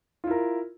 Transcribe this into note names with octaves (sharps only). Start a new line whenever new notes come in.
E4 F4 A#4